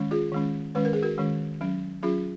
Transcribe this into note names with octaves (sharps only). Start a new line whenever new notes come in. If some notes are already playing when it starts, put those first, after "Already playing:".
Already playing: D#3 G#3 C#4
F4 G#4
D#3 G#3 C#4
D#3 G#3 C#4 B4
A#4
G#4
F#4 A#4
D#3 G#3 C#4
F#3 C#4
F#3 C#4 F4 G#4